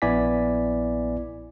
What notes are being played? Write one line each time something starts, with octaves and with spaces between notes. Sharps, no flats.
A#1 B3 E4 D5 G#5 B6